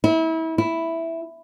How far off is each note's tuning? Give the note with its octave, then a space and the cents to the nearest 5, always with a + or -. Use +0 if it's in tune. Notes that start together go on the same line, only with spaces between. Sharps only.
E4 -30
E4 +0